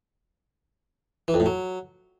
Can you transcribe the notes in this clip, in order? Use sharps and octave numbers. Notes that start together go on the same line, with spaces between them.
E3
F2
A2
F#3